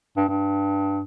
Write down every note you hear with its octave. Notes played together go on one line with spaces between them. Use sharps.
G2
G2